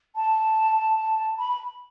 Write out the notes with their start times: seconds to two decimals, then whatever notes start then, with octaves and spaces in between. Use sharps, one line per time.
0.15 A5
1.38 B5